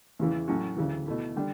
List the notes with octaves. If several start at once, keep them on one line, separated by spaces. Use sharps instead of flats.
E2 C#3 E3
A2 F#3 C#4 F#4
D2 C#3 E3
B2 A3 E4
D3 G3 D4